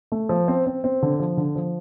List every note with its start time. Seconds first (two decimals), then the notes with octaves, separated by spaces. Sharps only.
0.12 A3
0.29 F3
0.48 C4
0.66 C4
0.84 C4
1.02 D3
1.20 F3
1.37 D3
1.56 F3